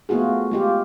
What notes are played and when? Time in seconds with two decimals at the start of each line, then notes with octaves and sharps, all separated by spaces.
0.09 A3 B3 F4 F#4 G#4
0.52 G#3 F4 G4